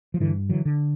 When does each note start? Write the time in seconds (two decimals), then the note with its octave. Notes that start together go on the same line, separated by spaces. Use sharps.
0.14 F3
0.20 G2 D3 E3
0.49 D3 E3 F#3
0.65 D3